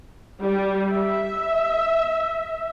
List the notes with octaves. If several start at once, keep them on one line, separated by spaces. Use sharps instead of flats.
G3
E5